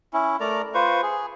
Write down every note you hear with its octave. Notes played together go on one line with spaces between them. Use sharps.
C#4 E4
A3 A#4 D5 A#5
F4 B4 C5 C#6
G#4